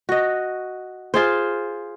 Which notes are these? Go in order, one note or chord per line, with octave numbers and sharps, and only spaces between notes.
F#4 D#5
F4 G#4 C5